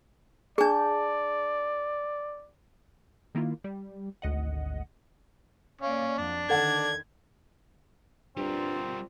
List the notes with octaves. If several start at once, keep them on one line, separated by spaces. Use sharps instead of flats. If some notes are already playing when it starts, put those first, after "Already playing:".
D4 G#4 D5 A5 G6
D#3 A#3 E4 F4
G3
G#1 D2 D#5 F#5
A#3 C#4 D5 F5
F2 F#3 D4
D3 D#3 A4 F#5 A5 G#6
G2 G3 C4 F4 A#4